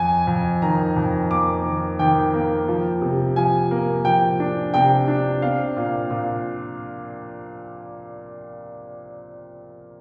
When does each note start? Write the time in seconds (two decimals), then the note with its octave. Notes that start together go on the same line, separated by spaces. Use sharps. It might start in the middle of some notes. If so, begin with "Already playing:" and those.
Already playing: F2 G#5
0.27 F2
0.62 D#3 A#5
0.96 F2
1.31 A#3 D6
1.65 D#3
1.99 D#3 G5
2.34 A#3
2.68 F3
3.02 C3
3.36 F3 G#5
3.71 A#3
4.05 F3 G5
4.40 D4
4.74 C3 G5
5.08 D4
5.42 C4 F5
5.77 A#2
6.10 A#2